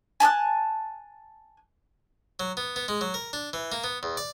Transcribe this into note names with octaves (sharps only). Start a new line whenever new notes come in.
G#5 A5 D#6 F#6
F#3
B3
B3
G#3
F#3
A#4
D4
E3
A#3
B3
E2
D5